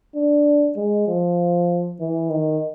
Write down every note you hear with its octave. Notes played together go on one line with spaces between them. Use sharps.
D4
G#3
F3
E3
D#3